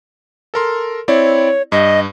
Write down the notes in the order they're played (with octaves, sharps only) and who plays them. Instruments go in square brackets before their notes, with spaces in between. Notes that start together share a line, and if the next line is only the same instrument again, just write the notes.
[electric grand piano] A4 A#4 C6
[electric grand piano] C4 E4 D5 [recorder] C#5
[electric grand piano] G2 [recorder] D#5